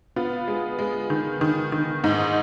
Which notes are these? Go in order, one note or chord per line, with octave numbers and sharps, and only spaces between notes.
B3 F4
G#3
G#3
D#3
D#3
D#3
G#2 D#4